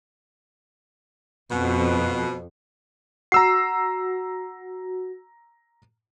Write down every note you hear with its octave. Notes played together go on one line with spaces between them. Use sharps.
F2 B2
F#4 A#5 E6 C7